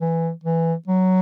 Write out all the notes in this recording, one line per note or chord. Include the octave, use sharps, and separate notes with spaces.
E3
E3
F#3